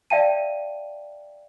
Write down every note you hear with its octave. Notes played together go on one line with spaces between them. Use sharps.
D5 E5 F5 G5 A5 D#7